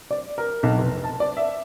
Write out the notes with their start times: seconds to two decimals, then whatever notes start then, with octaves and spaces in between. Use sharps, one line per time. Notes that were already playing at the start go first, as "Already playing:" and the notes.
0.11 D5
0.38 A#4
0.63 B1
0.78 F1
1.04 A5
1.20 D5
1.37 E5